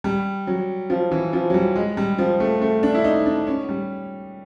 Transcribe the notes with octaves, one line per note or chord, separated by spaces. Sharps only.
G3
F#3
F3
E3
F3
F#3
G3
G#3
G3
F3
A3
A3
D4
E4
D#4
D4
C#4
G3